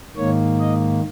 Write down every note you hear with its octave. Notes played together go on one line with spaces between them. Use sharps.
G#2 D#3 A#3 C#5
D#5